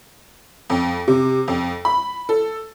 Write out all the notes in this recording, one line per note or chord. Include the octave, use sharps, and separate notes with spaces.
F2
C3
F2
B5
A4